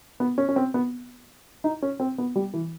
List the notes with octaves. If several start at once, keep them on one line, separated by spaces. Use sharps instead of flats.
B3
C#4
C#4
C4
B3
D#4
C#4
C4
B3
G3
E3